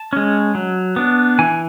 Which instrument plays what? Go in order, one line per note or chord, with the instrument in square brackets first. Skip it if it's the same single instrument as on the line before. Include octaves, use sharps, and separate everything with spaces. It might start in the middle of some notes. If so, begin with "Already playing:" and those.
Already playing: [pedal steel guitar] A5
G#3 C#4
F#3
B3 D4
E3 G#5